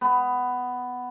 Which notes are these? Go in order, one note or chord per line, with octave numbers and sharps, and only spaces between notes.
B3